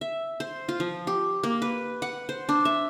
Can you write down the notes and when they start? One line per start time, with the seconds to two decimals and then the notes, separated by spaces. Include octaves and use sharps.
0.01 E5
0.40 C5
0.69 F4
0.80 F3
1.07 G4
1.43 A#3
1.62 B4
2.02 F#5
2.29 C5
2.49 D4
2.65 E5